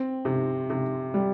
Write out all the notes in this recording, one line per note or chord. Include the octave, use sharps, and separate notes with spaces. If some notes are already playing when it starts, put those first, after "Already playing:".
Already playing: C4
C3
C3
G3